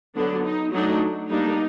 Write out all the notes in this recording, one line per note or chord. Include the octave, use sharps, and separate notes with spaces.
D3 F#3 B3 D4
D#4
F#3 A3 D4 D#4
G3 A#3 D4 D#4